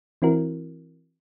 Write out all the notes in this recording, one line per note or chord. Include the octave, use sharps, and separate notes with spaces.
E3 C4 E4 F#4 A#4